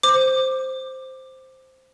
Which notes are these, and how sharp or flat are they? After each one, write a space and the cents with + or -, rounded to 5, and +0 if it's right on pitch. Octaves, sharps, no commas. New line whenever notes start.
C5 +0 D6 +15